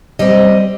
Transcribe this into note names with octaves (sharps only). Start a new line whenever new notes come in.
G3 C4 D#5